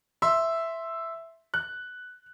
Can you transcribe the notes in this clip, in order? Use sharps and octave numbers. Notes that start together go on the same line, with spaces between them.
E5 C6 E6
F#6